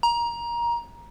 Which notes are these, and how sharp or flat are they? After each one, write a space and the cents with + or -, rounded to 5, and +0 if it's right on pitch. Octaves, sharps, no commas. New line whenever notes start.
A#5 +20